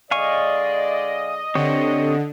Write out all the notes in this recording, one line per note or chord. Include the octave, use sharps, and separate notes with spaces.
D3 G#3 D5 D#5 F5 G#5 C#6
D3 C4 G4 C#5